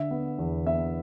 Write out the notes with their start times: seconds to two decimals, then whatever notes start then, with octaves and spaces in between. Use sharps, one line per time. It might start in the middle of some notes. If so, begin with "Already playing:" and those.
Already playing: D3 E5
0.11 B3
0.39 E2
0.66 B3 E5